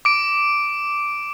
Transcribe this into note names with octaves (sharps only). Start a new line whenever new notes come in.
D6 D7